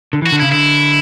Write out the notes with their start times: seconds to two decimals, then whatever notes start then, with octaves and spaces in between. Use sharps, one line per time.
0.13 D3
0.22 E3 F#4
0.32 D3
0.40 C#3 E4
0.51 D3 E4